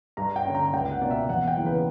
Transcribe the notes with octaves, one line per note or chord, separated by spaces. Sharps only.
G2 A#5
G5
D3 A#3 C#4
A#5
C#2 G5
F#5
B2 A#3 D5
E5
E2 F#5
G5
C#3 E3 A#3
B4